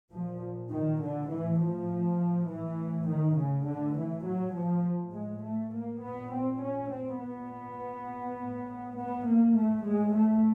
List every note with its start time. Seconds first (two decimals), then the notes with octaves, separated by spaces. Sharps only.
0.12 A#2 F3
0.71 D#3
1.01 D3
1.30 A2 E3
1.60 F3
2.48 A2 E3
3.07 D#3
3.37 C#3
3.66 A2 D3
3.96 E3
4.25 F#3
4.54 F3
4.84 A2
5.13 G#3
5.43 A3
5.73 A#3
6.02 A#2 B3
6.32 C4
6.61 C#4
6.91 C4
7.20 A#2 B3
8.38 A2
8.97 B3
9.27 A#3
9.56 A2 A3
9.85 G#3
10.14 A3